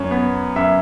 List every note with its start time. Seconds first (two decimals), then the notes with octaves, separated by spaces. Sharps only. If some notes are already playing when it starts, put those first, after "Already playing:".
Already playing: F#2 C#5
0.11 B3
0.56 F#2 E5